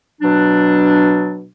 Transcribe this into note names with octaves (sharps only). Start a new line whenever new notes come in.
B2 F#3 D4